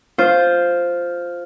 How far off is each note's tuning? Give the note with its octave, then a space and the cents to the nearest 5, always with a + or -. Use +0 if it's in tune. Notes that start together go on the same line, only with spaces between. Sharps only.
F4 +0 C5 +0